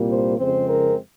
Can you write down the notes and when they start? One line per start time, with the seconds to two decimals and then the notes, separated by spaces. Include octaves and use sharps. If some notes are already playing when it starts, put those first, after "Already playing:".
Already playing: C2 A#2 G3 A#3
0.08 C5
0.38 F2 C#3 G#3 C4 C5
0.68 A#4